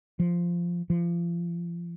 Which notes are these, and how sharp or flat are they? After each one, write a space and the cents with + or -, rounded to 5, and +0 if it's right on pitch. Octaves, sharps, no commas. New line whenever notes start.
F3 -5
F3 -30